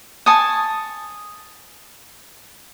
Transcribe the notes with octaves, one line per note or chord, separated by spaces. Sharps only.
G#5 A5 C#6 D#6